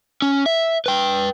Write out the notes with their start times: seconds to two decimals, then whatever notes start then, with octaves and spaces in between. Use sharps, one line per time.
0.22 C#4
0.46 E5
0.86 B4 G5